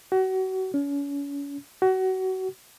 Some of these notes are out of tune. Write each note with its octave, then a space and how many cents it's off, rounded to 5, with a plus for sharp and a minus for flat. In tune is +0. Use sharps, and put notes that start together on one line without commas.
F#4 +30
C#4 +35
F#4 +25